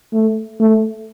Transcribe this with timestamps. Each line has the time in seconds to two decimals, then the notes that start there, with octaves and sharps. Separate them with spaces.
0.13 A3
0.60 A3